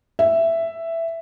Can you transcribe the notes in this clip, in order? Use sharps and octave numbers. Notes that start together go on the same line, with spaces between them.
E5